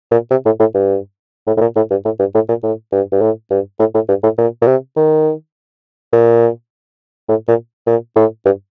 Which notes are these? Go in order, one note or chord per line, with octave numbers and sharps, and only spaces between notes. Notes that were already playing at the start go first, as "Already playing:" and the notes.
A#2
C3
A2
A2
G2
A2
A2
A#2
A2
G2
A2
G2
A2
A#2
A2
G2
G2
A2
G2
A2
A2
G2
A2
A#2
A#2
C3
D#3
A#2
A2
A#2
A#2
A2
G2